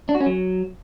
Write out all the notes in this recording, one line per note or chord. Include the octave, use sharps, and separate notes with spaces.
D4
F#4
C#4
F#3